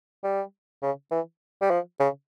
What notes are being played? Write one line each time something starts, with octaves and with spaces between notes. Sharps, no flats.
G3
C#3
E3
G3
F3
C#3